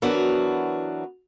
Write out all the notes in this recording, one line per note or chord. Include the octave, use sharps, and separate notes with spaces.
E3 F#3 B3 D4 F#4 A#4